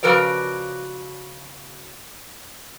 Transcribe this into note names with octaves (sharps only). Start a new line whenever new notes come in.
C#3 F3 F#4 A#4 B4 D5